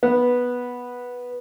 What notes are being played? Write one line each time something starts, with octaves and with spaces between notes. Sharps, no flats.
B3